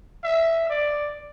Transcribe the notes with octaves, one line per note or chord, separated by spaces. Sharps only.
E5
D5